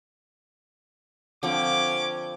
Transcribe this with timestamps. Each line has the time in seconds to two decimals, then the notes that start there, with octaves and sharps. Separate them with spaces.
1.43 D3 F3 C4 C#4 D6